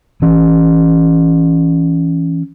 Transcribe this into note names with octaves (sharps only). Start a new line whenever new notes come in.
E3 C#4